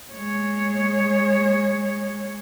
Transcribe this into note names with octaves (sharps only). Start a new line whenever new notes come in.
G#3 C#5